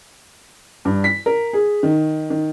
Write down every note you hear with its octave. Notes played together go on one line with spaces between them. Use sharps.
G2
B6
A#4
G#4
D#3
D#3